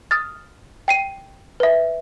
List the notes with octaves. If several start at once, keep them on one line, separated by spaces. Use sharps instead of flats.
D#6 F6 A6
G5 C7 D#7
B4 E5